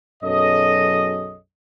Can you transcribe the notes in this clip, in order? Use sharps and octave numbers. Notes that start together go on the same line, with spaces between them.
B1 F#2 G#4 A4 C#5 D#5